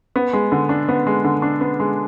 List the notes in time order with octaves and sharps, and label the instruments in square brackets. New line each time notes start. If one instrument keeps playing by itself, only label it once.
[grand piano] B3
G#3
D3
D4
B3
G#3
D3
D4
B3
G#3